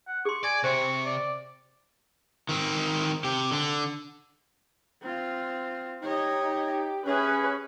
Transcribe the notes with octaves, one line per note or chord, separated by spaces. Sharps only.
F#5
G#4 C6 C#6
D5 G#5
C3 C5 C6 C#6
D5
D#3 C4
C3 G4
D3 D4
C4 F4
D#4 G4 C#5 D#5
C#4 G#4 B4 E5